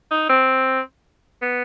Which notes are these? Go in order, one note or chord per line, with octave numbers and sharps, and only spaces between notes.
D#4
C4
B3